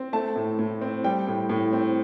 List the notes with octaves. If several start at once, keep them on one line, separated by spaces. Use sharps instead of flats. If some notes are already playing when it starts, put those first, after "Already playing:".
Already playing: C4
A3 A5
A2
A2
C4
G3 G5
A2
A2
C4